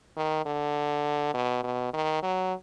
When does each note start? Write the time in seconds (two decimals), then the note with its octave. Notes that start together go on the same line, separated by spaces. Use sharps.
0.17 D#3
0.46 D3
1.34 B2
1.64 B2
1.93 D#3
2.23 F#3